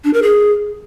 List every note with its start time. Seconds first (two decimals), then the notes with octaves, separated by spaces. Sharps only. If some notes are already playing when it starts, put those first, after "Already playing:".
0.04 D4
0.13 A#4
0.23 G#4